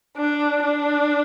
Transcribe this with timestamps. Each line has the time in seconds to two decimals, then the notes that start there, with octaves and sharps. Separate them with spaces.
0.17 D4
0.63 D4